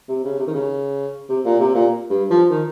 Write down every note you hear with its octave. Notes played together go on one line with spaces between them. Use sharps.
C3
C#3
C3
D#3
C#3
C3
A#2
C3
A#2
G2
F3
D#3